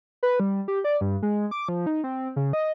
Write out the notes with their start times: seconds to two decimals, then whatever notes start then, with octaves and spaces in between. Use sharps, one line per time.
0.23 B4
0.40 G3
0.68 G4
0.84 D5
1.01 G2
1.23 G#3
1.51 D6
1.69 F3
1.86 D#4
2.04 C4
2.36 C#3
2.53 D#5